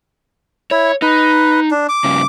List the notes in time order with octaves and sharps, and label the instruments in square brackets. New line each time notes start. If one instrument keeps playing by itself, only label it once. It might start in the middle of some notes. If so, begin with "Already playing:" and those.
[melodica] E4 [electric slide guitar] C#5
[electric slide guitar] D#4 [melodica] B4
[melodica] D4
D6
[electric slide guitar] G2 C#3